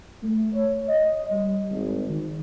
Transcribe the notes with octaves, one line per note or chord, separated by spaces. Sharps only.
A3
C#5
D#5
G3
G#1
D#3